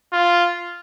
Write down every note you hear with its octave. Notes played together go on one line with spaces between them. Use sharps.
F4